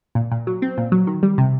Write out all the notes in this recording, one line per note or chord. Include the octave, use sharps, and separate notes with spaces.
A#2
A#2
F#3
C4
A#2
F#3
D#3
G3
C3